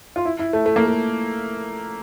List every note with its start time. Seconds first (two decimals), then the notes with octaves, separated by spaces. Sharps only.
0.16 F4
0.25 E4
0.39 E4
0.53 A3
0.66 A3
0.76 A#3
0.87 A3